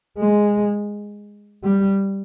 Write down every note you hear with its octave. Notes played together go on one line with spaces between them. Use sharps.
G#3
G3